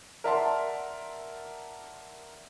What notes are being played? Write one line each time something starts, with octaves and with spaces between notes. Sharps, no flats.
A#4 D5 E5 F#5 A5 C6